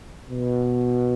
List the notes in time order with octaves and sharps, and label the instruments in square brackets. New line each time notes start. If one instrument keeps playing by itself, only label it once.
[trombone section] B2